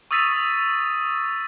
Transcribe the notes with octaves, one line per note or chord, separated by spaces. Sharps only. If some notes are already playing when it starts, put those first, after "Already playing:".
C#6 D#6 E6 A6 B6 D#7